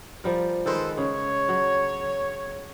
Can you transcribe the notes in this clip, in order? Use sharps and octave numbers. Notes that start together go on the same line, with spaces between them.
F3 G3 A#4
D#3 G#3 A4 B4 C5
C#3 C#5
F#3